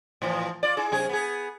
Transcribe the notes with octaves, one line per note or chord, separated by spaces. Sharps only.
A2 E3 F3
F4 D5
E4 G#4
F#2 C3 G#4
B3 G#4